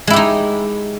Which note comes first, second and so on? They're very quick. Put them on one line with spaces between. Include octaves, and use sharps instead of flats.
G#3 E4 G4 D#4